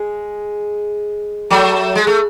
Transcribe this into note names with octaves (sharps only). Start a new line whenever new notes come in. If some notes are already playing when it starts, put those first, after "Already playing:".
Already playing: G#3
F#3 A3
G#3
A3